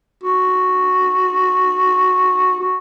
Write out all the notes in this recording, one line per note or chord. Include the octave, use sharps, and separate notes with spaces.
F#4
F#4